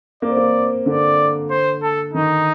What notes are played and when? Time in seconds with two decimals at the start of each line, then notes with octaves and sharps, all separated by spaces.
0.22 A#3 D5
0.29 C4
0.37 A#3
0.86 D3 D5
1.50 C5
1.82 A4
2.13 D#3 D#4